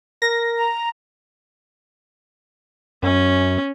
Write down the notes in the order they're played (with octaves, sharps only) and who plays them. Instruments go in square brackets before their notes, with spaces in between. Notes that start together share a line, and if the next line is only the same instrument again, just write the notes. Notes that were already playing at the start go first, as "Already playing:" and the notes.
[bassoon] A#4 [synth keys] A#6
[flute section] A#5
[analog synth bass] F#2 [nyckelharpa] C#4